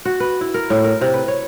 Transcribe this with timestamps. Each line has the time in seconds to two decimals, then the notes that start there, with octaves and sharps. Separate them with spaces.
0.05 F#4
0.20 B4
0.41 E4
0.54 A#4
0.70 A2
0.84 A#4
1.01 C3
1.14 B4
1.28 C#5